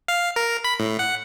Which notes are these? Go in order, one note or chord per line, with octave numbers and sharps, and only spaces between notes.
F5
A#4
B5
A2
F#5